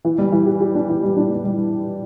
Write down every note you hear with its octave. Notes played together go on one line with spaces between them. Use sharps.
E3
G3
E3
G4
G4
D4
E3
G3
D4
G3
G3